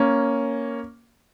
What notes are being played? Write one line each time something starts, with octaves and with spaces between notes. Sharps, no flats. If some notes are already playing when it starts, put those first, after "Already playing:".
Already playing: A#3 C#4